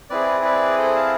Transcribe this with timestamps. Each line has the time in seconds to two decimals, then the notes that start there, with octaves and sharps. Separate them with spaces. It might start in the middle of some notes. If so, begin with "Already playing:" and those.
0.10 C4 E4 G#4 B4 D5
0.44 B4 D5
0.78 A4 C5
0.96 F5 A5